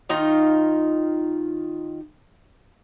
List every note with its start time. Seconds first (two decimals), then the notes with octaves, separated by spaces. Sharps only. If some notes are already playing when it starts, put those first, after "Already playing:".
0.09 D#3 D#4 F4